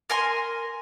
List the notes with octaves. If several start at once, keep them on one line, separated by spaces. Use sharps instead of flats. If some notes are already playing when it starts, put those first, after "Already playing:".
A#4 G#5 C6